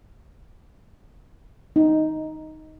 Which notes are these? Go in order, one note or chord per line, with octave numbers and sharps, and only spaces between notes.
D#4